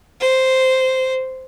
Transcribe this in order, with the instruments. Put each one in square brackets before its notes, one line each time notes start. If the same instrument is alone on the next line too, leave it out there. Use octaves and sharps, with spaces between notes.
[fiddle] C5